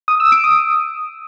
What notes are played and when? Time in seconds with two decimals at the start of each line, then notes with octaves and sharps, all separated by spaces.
0.08 D#6
0.20 E6
0.32 D7
0.44 D#6